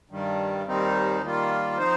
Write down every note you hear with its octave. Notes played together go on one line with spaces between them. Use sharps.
G2 D#3 G3
D#2 D#3 G3 C4 D#4
D#3 G3 A#3 F4
F3 C4 D#4 C5